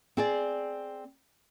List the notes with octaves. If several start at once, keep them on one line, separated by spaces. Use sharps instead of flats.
C4 G#4 D5